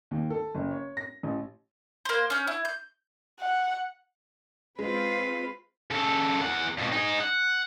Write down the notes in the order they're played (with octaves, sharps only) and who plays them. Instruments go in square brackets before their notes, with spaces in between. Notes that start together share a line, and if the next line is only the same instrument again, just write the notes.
[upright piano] D#2
A4
F#1
C#5
A#6
A1
[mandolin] A#3 C5
C#4 G6
E4
G6
[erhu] F#5
[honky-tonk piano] G#3 [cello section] C4 F4 [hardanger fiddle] B4
[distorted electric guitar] C#3 A4
E2 F#5
F2 B2
D#4 G#4
F#5